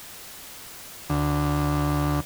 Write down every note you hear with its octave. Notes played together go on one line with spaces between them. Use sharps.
D2